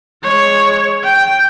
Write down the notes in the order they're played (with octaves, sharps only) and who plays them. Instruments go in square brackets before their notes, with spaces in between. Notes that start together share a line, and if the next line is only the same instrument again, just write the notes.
[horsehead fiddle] G#3 C#5
G5